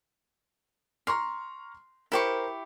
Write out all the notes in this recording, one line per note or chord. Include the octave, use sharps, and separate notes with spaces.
A#5 C6 C#6 F6
E4 G4 A#4 C5 C#6